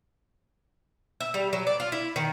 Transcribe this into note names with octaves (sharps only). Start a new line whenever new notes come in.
E5
G3
F#3
D5
F4
E4
D#3